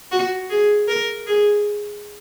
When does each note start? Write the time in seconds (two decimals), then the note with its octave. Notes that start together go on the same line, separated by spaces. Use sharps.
0.11 F#4
0.50 G#4
0.88 A#4
1.27 G#4